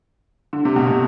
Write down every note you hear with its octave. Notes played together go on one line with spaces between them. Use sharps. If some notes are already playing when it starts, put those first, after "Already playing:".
D3
C3
B2
A2 C3